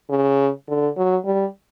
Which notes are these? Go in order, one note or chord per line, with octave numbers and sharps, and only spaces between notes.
C#3
D3
F#3
G3